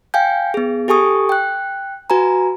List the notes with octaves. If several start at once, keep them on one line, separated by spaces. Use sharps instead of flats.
F5 G5 G#5 G6
B3 G#4
G4 A4 G#5 C#6 D#6
G5 F#6
F#4 B4 G#5 A#5